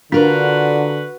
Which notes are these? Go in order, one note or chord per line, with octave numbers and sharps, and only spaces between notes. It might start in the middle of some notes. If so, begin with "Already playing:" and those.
D3 D4 F4 F#4 A#4 B4